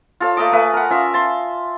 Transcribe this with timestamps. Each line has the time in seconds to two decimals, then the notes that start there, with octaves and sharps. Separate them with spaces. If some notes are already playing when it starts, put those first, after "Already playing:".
0.20 F4 A4 C#5
0.37 A3 A#3 D#5 D6
0.52 A3 B4 G#5
0.73 A#4 F#5
0.90 C#4 F4 E5
1.14 A5 C6